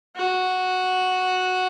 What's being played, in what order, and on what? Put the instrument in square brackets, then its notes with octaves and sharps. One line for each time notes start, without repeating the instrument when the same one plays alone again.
[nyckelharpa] F#4